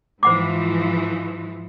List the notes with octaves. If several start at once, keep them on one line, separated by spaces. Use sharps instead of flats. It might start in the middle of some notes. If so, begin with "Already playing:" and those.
G#2 E3 F3 C5 F#5 D6